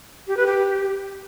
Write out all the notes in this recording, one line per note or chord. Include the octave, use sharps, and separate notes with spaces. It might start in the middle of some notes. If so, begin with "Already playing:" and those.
G4
B4
G4